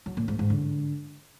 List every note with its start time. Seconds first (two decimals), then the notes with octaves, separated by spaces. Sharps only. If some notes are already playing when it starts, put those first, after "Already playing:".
0.06 F#3
0.17 A#2
0.28 G#2
0.39 G#2
0.50 D3